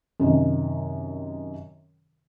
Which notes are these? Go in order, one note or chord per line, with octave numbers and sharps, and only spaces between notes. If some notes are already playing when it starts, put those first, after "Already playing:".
F#2 C3 D#3